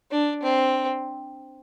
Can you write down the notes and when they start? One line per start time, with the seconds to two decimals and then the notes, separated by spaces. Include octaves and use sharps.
0.11 D4
0.42 C4